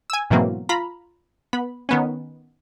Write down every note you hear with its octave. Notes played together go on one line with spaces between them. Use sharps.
G#5 E6
G#2 B2 E3 F#3 A#3 C4
F4 A#5 B5
B3 B5
D#3 B3 C#4